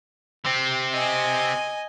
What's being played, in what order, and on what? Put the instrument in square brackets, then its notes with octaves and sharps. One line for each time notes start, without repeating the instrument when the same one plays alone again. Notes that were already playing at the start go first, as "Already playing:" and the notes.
[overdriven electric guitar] C3 C4
[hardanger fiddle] D#5 G#5